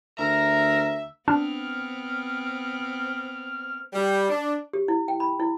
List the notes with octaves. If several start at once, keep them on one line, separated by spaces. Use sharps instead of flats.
D2 A#4 E5 A#5
B3 C4 D4 F6
G3
D4
G4
E4
G5
B5
E4